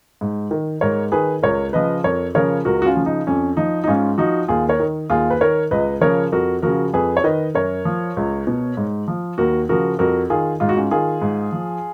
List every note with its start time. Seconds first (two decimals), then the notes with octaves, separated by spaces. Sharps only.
0.21 G#2
0.51 D#3
0.81 G#2 A#4 C#5
1.12 D#3 G#4 B4
1.43 C#2 A#4 C#5
1.73 C#3 F3 B4 D#5
2.04 F2 A#4 C#5
2.35 C#3 F3 A#4 C#5
2.65 C#2 F#4 A#4
2.82 F#4
2.86 C#4 F4
2.95 C#3 F3
3.06 D#4
3.27 F2 C#4
3.57 F3 D#4
3.84 D#4
3.87 G#2 C#4 F4
4.18 F3 D#4 F#4
4.48 D#2 F4 G#4
4.69 A#4 C#5
4.80 D#3
5.10 D#2 F4 G#4
5.30 B4
5.41 D#3 A#4 C#5
5.71 C#2 B4 D#5
6.01 C#3 F3 A#4 C#5
6.32 F2 F#4 A#4
6.62 C#3 F3 F#4 A#4
6.93 F2 G#4 B4
7.17 C#5
7.24 D#3 B4 D#5
7.55 F#2 A#4 C#5
7.85 F3
8.17 C#2
8.47 B2
8.77 G#2
9.08 F3
9.38 D#2 F#4 A#4
9.69 C#3 F3 F#4 A#4
9.99 F2 F#4 A#4
10.30 D#3 F4 G#4
10.60 G#2 F4
10.69 F#4
10.76 C#4 F4
10.91 D#3 F4 G#4
11.22 G#2
11.52 F3